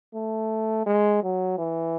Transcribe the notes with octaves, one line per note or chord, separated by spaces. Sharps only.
A3
G#3
F#3
E3